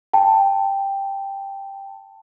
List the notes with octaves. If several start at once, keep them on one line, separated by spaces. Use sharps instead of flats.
G5 A5